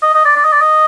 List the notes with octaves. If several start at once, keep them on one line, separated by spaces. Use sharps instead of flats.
D#5
D#5
D5
D5
D#5
D5
D#5